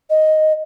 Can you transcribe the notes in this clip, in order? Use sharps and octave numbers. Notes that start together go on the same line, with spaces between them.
D#5